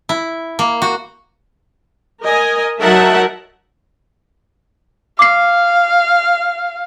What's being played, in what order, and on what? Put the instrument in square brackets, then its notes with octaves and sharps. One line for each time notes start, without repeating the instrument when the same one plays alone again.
[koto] E4
A#3
F#4
[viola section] A#4 D#5 G#5
F#3 D#4 A#4 E5 F#5 A5
[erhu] F5 [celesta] D6 C7